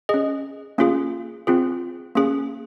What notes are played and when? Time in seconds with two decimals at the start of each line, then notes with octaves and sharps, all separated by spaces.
0.09 C#4 G#4 D#5
0.78 A#3 C#4 F4 G#4
1.47 C4 F4 G#4
2.15 A#3 C#4 G#4